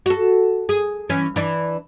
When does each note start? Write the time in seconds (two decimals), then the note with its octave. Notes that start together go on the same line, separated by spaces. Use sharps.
0.06 F#4 A4
0.69 G#4
1.09 E3 C#4
1.36 E3 D4